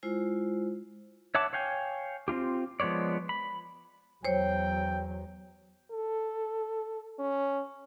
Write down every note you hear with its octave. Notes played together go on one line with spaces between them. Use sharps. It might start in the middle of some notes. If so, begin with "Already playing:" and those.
G#3 E4 F4 C5
C#5 E5 F#5 A5 D6
C#5 F5 G5 G#5
C4 D4 F4 G4
F3 G#3 B3 C#5 D5
B5
E2 F#3 C5 C#5 G5
A4
C#4